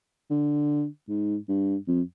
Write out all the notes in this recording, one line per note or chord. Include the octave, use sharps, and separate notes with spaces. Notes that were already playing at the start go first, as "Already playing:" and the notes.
D3
G#2
G2
F2